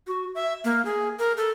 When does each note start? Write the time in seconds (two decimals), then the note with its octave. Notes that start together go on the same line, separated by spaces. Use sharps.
0.07 F#4
0.35 E5
0.65 A#3
0.85 G#4
1.19 A#4
1.37 A4